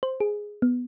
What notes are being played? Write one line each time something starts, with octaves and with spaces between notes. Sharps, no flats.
C5
G#4
B3